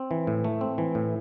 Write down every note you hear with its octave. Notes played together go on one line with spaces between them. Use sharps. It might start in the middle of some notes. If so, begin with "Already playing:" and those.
Already playing: C4
E3
A2
A3
C4
E3
A2